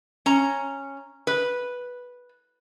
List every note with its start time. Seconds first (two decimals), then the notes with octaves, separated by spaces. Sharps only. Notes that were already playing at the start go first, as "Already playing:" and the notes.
0.26 C#4 A#5
1.27 B4